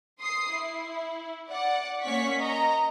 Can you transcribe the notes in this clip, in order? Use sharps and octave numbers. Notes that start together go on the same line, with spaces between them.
C6 D#6 C7
E4
D5 F#5
A#3 C#4 C#5 F#5 C#6 B6
D#5 A#5